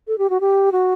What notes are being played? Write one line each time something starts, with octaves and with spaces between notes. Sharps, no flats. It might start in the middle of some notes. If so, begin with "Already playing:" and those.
A4
G4
F#4
G4
F#4